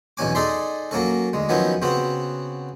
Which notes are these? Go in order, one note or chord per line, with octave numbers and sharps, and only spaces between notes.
B1 E2 B2 C#4 G#5 D6
D#4 G#4 A4 D5 E5 C6
F#3 A#3 C#4 A4
D2 G#3
D#3 F3 F#3 B3 C#4 E4
C#3 B3 C4 F#4